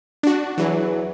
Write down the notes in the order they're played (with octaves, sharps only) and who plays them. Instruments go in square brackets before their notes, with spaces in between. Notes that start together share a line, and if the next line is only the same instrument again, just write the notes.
[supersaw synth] D4 F#4
[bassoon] E2 [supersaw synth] E3 F#3